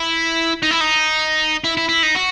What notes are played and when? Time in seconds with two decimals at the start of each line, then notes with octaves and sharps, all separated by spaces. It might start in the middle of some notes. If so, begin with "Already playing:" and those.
Already playing: E4
0.63 D#4
0.71 E4
0.81 D#4
1.64 E4
1.77 E4
1.89 E4
2.03 D#4
2.15 F#4